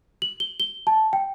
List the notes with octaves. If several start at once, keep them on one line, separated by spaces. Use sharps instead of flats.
F#7
G7
G7
A5
G5